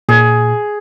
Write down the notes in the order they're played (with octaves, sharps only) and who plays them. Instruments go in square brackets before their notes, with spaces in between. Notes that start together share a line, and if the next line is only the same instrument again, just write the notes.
[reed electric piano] A#2 [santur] G#4